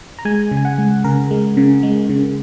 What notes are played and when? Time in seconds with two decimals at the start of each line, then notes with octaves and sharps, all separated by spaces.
0.19 A#5
0.25 G#3 G#5
0.51 C#3
0.57 G#5
0.65 F#5
0.78 G#3
1.04 C#3 A#4
1.31 G#3
1.57 C#3
1.83 G#3
2.09 C#3